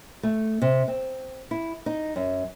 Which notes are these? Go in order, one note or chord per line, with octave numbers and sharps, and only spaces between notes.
A3
C3
C4
E4
D#4
F#2